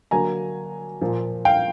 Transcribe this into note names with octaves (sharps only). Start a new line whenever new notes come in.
D3 F#3 A#3 G#5 A#5
A#2 F3 A#3
F5 G5